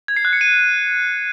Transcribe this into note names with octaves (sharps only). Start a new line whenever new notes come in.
G#6
C7
F#6
C#7
D#7